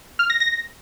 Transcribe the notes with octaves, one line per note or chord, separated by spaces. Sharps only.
F6
A#6
A#6